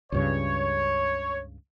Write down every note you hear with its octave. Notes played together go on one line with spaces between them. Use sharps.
C#2 G2 C#3 C#5